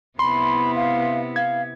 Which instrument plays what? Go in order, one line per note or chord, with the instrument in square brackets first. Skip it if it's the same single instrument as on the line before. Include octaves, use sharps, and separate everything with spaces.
[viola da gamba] C3 B3 E4 [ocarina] B5 [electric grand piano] C6
[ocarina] F5
[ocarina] F5 [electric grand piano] G#6